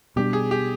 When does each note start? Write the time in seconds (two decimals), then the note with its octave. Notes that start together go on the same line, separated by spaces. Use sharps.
0.16 B2 G3 B3 D4 G4
0.33 G#4
0.51 G4